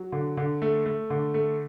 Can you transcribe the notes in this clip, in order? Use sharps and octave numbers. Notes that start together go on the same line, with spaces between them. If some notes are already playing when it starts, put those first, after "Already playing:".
Already playing: F#3
D3
D3
A3
A3
D3
A3